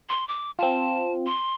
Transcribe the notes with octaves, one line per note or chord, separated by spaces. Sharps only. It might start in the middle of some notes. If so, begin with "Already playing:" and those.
C6
D6
C4 F4 A5
C6